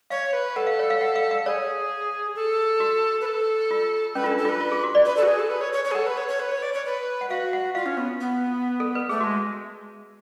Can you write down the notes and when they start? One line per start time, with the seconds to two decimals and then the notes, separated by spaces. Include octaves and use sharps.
0.10 C#5 F5
0.33 B4
0.56 A4 F#5
0.67 F5
0.79 C#5
0.90 F5
1.01 F#5
1.16 F5
1.31 F5
1.46 G#4 C#5
2.36 A4
2.80 F#4
3.21 B4
3.25 A4
3.71 F4
4.15 C#4 B4
4.24 F4 A4
4.31 D4
4.38 A4
4.45 F4 B4
4.61 F4
4.72 G#4
4.84 F#4
4.95 D5
5.05 B4
5.17 A4
5.23 F#4
5.28 G#4
5.39 A4
5.50 B4
5.61 C#5
5.73 C#5
5.84 C#5
5.91 G#4
5.95 A4 F#5
6.06 B4
6.17 C#5
6.28 C#5
6.40 B4
6.52 C#5
6.62 D5
6.74 C#5
6.85 B4
7.21 F#5
7.30 F#4 F5
7.53 F#5
7.75 F4 F5
7.86 C#4
7.97 B3
8.20 B3
8.80 A4
8.95 B4
9.09 A3 G#4
9.20 G#3 F#4